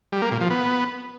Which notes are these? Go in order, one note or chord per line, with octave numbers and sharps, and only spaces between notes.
G3
A#3
A#2
F3
B3